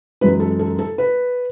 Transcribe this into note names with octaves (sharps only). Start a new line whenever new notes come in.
F#2 E3 G#3 B4
A4
A4
A4
B4